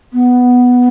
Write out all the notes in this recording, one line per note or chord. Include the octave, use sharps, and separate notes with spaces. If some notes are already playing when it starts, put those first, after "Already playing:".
B3